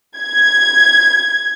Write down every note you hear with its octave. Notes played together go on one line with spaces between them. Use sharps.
G#6